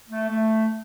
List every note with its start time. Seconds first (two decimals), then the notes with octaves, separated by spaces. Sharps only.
0.09 A3
0.29 A3